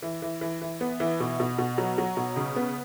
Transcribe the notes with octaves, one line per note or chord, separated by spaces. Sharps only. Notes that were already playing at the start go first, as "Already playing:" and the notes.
E3
E3
E3
E3
B3
E3
B2
B2
B2
F#3
F#3
B2
C#3
B3